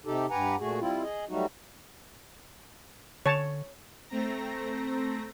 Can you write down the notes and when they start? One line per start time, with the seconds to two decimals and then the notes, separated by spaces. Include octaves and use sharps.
0.05 C3 D#4 G4 A4
0.30 G2 G4 B4 F#5 G#5 A#5
0.59 A#2 A3 F#4 G#4
0.80 G3 C4 E4 F4
1.03 G#4 D#5
1.29 F#3 G3 A3 D#4 F#4
3.26 D3 C#5 A5
4.09 A3 C4 A#5 A#6